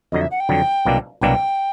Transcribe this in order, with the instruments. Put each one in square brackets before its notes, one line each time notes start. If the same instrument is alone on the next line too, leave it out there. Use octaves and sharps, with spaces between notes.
[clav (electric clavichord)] F2 D3 F#3 [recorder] D#5
[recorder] E5
F#5
G5
[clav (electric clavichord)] F2 D3 F#3
C2 B2 F#3 A#3 D4
[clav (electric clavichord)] C2 B2 F#3 A#3 D4 [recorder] G5